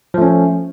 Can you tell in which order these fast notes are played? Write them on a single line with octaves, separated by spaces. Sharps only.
F3 A3 C#4